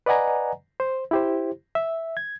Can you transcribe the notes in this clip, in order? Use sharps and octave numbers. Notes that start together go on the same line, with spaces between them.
B4 D5 D#5 F#5 G#5 A#5
C5
E4 G4 C5
E5
G#6